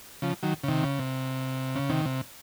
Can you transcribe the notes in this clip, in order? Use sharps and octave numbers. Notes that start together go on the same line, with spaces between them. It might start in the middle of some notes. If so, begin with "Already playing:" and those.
C#3 F3
D#3 F#3
C#3
C3 D#3
C#3
C3
C#3
C3 D#3
C3